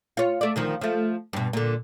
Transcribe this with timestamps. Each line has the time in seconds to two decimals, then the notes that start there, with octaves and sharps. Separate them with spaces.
0.17 F4 C#5
0.41 A3 D5
0.56 D2 D#3 F3
0.81 F3 A3
1.33 G2 B2
1.53 A#2 D3